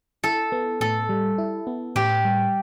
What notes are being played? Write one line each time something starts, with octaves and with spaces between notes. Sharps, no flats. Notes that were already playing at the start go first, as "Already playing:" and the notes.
E4 A4
B3
A2 A4
G3
E4
B3
A2 G4
G3